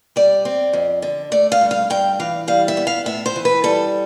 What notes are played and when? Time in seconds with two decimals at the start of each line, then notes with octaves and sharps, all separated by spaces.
0.16 G3 D5
0.45 C4
0.73 F2
1.02 D3
1.32 A3 D5
1.52 F5
1.61 G2
1.71 F5
1.90 G2 G5
2.20 E3 F5
2.48 G3 F5
2.68 E5
2.77 B3
2.87 F5
3.06 A2 E5
3.26 C5
3.36 E3
3.45 B4
3.64 G3 A4